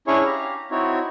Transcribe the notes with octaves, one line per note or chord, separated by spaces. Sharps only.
C#4 D4 E4 G#4 C#5 C#6
G4 F5 A#5
C4 D#4 E4 F#4 C#5